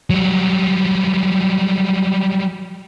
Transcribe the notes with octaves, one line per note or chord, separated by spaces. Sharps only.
F#3 G3